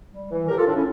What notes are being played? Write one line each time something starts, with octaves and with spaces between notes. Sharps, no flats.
G3
E3
A2 G4 A#4
F4 A4
A2 D4
C#4 E4